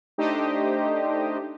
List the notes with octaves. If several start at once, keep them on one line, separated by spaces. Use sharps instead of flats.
A3 D4 D#4 G4 C5 D#5